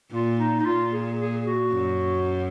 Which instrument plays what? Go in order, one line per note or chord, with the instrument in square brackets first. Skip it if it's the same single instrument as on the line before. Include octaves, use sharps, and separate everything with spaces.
[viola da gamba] A#2 [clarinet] F4
[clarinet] D#4
D#4
[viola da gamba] A#2 [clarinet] F4
[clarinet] G#4
G#4
F#4
[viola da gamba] F#2